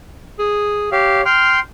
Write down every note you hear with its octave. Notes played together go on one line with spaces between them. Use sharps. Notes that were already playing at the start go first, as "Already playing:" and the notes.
G#4
G4 C#5 F5
G5 C6 F6